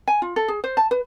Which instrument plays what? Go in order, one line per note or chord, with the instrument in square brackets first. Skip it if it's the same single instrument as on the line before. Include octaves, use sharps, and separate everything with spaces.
[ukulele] G#5
F4
A4
G#4
C5
A5
B4